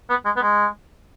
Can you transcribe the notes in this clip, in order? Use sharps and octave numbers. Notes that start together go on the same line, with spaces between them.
B3
G#3
B3
G#3